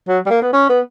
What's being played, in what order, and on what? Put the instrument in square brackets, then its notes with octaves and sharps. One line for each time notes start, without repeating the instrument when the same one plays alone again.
[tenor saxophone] F#3
G3
A#3
B3
C#4
B3